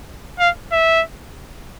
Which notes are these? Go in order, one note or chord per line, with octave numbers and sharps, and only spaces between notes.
F5
E5